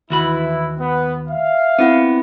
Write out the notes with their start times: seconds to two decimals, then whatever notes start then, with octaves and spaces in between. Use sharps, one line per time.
0.10 D#2 E3 E4 F#4 B5
0.78 B3
1.29 E5 F5
1.79 B3 C4 E4 F#5